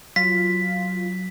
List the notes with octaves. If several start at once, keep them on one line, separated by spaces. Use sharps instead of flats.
F#3 F4 B6